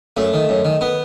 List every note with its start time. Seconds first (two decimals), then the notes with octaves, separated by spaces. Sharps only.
0.17 F#2 A3
0.33 D#3
0.49 F#2
0.65 D#3
0.81 B3